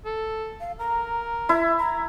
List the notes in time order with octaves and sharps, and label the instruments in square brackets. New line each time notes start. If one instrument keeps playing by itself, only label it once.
[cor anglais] A4
[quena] F5
[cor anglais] A#4 [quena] A#5
[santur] E4 [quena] E5
[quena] A#5